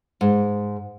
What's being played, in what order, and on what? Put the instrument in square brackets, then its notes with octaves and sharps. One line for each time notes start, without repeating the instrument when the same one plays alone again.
[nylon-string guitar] G#2